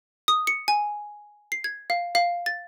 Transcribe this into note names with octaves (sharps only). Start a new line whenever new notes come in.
D#6
C#7
G#5
C7
G#6
F5
F5
A6